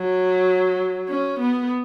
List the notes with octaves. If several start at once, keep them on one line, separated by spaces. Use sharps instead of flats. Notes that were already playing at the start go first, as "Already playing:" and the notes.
Already playing: F#3
C#4
B3